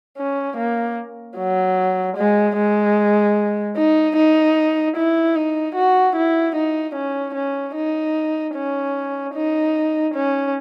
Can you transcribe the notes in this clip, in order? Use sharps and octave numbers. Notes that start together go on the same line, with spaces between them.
C#4
A#3
F#3
G#3
G#3
D#4
D#4
E4
D#4
F#4
E4
D#4
C#4
C#4
D#4
C#4
D#4
C#4